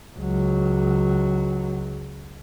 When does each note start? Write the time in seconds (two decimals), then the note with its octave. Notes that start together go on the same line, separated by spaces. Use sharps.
0.18 C#2 F#3